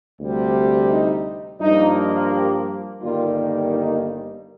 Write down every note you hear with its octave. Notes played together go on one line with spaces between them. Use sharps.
D2 C3 G3
D#4
G2 F3 A#3 D#4
G4
G1 G2 D#3 G3 A#3 F4
D#4